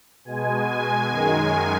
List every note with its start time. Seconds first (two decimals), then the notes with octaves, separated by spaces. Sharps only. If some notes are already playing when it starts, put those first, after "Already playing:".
0.25 B2 G#3 G#5
0.68 G#5
1.10 F#2 D#3 G#3 G#5